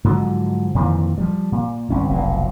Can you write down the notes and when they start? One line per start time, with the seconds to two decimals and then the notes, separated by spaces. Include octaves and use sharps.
0.04 G#2 D3 F3 F#3
0.75 F2 A#2 D#3 E3
1.18 F3 G3
1.52 A#2
1.90 G1 C2 C#4
2.09 F1 B1 A#2